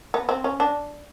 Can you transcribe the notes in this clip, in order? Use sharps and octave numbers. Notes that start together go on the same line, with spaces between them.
B3
C4
C#4
D4